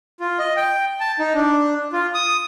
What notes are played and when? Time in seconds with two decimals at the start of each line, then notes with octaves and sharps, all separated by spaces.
0.20 F4
0.39 D#5
0.57 G5
1.00 A5
1.19 D#4
1.34 D4
1.93 F4
2.14 D#6